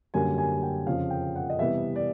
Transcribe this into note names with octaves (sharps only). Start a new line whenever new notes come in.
F#2 D3 G3 A#3 G#5
G#5
G5
F2 C#3 F3 F5
G5
F#5
D#5
C3 E3 G3 B3 E5
D5